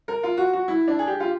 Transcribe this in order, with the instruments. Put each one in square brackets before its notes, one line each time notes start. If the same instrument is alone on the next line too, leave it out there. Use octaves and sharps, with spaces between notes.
[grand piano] A#4
F4
F#4
F#4
E4
D4
G#4
G4
F4